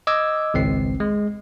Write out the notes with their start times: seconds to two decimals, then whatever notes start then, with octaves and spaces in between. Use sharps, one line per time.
0.07 D#5 D6 E6 G#6
0.54 G#1 C#2 C4 C7
1.00 G#3